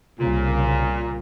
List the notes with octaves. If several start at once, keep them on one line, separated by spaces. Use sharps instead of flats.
C2 A#2 C#3